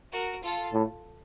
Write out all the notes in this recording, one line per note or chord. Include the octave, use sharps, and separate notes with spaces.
F#4 A#4
F4 A4
A2